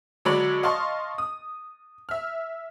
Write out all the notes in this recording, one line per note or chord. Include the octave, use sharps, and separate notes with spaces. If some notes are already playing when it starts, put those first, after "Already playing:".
D3 F#3 G#3 C#5 D5 B5
D#5 F5 A5 C6 C#6
D#6
E5 F6